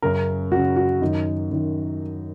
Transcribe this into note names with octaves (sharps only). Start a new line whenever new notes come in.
F#2 C#3 A#4
F#2 C#3 F#4
F#4
F#2 D#3 D#4
F#2 D#3